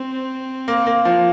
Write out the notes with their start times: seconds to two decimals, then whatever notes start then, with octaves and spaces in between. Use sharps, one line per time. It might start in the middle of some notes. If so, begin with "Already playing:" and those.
Already playing: C4
0.68 A#3
0.87 A#3
1.05 F3